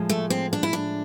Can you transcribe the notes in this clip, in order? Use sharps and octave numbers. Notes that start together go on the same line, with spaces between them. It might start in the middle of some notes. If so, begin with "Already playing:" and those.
Already playing: A2 F3 G#3
A3
C4
D4
E4
D4